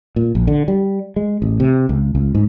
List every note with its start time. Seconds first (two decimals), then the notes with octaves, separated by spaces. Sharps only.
0.16 A#2
0.35 A#1
0.47 D3
0.68 G3
1.16 G#3
1.42 A1
1.60 C3
1.89 C#2
2.15 C#2
2.35 G#2